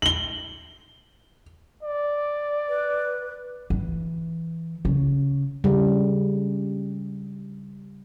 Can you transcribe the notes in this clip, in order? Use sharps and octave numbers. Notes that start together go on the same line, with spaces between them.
F#7 G7
D5
B4
E3
C#3
C#3 G3